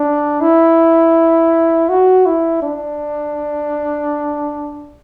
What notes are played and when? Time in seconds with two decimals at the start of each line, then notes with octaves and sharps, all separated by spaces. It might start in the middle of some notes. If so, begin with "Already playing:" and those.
Already playing: D4
0.41 E4
1.89 F#4
2.26 E4
2.62 D4